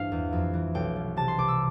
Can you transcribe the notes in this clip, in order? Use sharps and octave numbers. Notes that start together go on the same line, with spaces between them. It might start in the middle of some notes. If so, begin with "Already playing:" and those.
Already playing: A1 G2 C5 F5
E2
F2
E3
B1 G5
B2
C3 A5
C6
C2 D6
E6